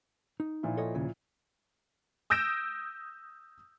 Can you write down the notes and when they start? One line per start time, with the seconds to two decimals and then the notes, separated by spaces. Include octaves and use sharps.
0.40 D#4
0.63 A#2 F3 E4
0.77 A4 C#5 D#5
0.95 D#2 C#3
2.30 D#6 E6 G6 A#6 D7 E7